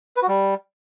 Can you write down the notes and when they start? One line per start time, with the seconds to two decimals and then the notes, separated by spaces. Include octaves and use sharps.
0.16 B4
0.22 F#4
0.28 G3